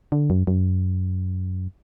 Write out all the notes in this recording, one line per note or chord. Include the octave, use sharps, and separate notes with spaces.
D3
F#2
F#2